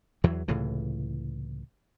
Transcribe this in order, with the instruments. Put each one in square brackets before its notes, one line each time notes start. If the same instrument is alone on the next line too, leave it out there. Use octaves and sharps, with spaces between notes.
[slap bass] E2 E3 F#3
C#2 A2 C3 E3